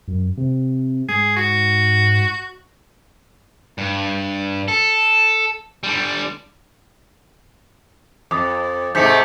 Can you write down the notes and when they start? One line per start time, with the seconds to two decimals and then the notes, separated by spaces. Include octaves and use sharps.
0.08 F#2
0.38 C3
1.09 G#2 G#4
1.37 F#4
3.78 G2
4.68 A4
5.83 D3 G3
8.31 F2 D6 D#6 A6
8.95 G#2 C3 A3 G6 B6 C#7